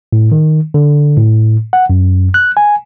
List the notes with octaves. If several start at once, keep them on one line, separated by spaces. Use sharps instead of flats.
A2
D#3
D3
A2
F#5
F#2
F#6
G#5